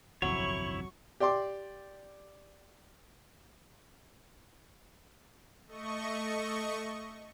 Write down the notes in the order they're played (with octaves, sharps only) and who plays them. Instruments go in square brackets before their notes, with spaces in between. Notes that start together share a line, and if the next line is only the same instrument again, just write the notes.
[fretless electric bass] G1 C2 F2 [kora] F#3 [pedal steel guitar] E4 C#5 [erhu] C#6
[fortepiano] G4 D5 G5 C6 D6
[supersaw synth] A3 D#5 C#6